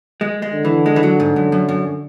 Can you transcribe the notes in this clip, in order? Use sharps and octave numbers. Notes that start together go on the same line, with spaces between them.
G#3
G#3
D3
E3
G#3
E3
F#3
G#2
F#2
F#2
F#2